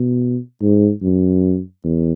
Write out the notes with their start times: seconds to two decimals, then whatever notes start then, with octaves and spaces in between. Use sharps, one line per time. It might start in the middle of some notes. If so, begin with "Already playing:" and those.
Already playing: B2
0.62 G#2
1.03 F#2
1.84 E2